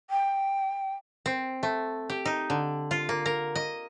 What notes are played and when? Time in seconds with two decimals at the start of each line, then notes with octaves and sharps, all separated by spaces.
0.10 G5
1.26 C4
1.63 A3
2.10 G4
2.25 D#4
2.50 D3
2.91 F4
3.09 A#3
3.26 A#4
3.55 D#5